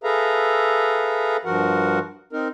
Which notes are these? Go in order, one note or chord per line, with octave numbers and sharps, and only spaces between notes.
G#4 A4 B4 E5 F5 A#5
G2 F3 F#4 A#4 F#5
C4 D#4 A#4